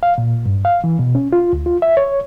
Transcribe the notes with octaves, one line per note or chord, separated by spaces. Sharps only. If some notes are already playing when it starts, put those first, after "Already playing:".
F5
A#2
G2
F5
E3
B2
C#4
F4
D2
F4
E5
C#5